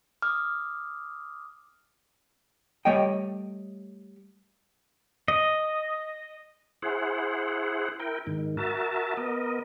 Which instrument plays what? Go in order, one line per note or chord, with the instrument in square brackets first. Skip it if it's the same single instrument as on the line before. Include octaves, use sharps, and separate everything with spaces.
[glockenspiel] D6 D#6 [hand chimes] F6
[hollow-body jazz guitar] G3 A3 C#5 D#5 G5
[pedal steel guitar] D#5
[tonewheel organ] E4 G#4 C5 F#5
E4 A#4 G5
G#2 D#3
F#4 A#4 E5 A5
B3 A#4 D#5